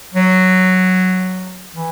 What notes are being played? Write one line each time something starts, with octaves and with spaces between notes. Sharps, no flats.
F#3
E3